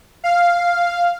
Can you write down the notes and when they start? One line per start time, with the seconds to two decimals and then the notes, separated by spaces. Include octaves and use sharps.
0.24 F5